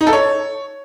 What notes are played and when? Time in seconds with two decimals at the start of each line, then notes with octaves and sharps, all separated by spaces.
0.01 D#4
0.07 A4
0.13 C#5